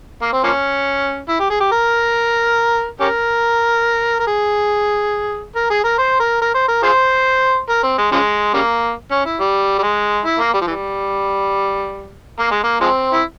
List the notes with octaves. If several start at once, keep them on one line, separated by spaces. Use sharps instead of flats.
A#3
C4
F3 A#3 C#4
E4
G4
G#4
G4
A#4
C#4 G4 A#4
A#4
G#4
A#4
G#4
A#4
C5
A#4
A#4
C5
A#4
F4 G#4 C5
A#4
C4
G#3
C#3 F3 G#3
C#3 G3 A#3
C#4
E4
G3
G3
G#3
E4
A#3
G3
F3
E3 G3
A#3
G#3
A#3
F3 G#3 C4
E4